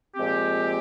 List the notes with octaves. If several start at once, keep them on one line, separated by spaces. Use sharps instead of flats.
A#2 F3 G#3 C4 G4